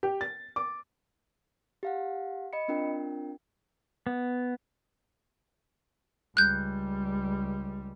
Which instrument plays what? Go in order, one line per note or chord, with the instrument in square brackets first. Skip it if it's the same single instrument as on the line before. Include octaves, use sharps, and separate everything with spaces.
[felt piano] G4
A6
D6
[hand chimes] G4 F5 F#5
D#5 B5 C#7
C4 D4 F4 A#4 G5
[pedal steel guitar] B3
[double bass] C#2 G3 [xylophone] F#6 G6